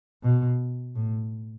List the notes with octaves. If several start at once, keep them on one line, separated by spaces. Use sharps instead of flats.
B2
A2